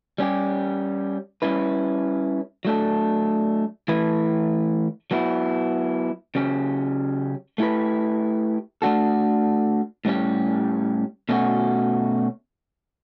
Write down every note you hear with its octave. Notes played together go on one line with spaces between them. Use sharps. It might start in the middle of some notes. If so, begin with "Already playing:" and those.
G3 C#4 G4
G3 C#4 E4 B4
F#3 A3 D4 A4
E3 A3 E4 B4
F#3 B3 E4
C#3 F#3 C#4 G4
A3 E4 G4 B4
A3 D4 F#4 A4
A2 G3 C#4 G4
B2 A3 C#4 F#4